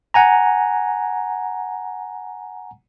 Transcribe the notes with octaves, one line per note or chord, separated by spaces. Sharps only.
F#5 G#5 A#5